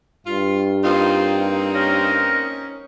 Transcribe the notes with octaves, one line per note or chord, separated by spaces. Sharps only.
G2 F4
A#3 C4 D#4 F4
C#4 A#4